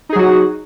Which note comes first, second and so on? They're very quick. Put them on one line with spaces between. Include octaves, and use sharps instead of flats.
D#4 G#4 F#3 F#4